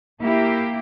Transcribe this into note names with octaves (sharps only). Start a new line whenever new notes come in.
A#3 E4 G4